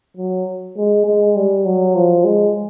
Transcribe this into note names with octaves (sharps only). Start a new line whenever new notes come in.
F#3
G#3
G#3
G3
F#3
F3
G#3